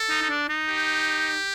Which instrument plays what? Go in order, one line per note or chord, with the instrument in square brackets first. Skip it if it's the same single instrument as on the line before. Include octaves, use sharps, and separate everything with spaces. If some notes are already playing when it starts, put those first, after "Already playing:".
Already playing: [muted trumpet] A4
[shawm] D#4
D#4
D4
D#4
[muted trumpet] G4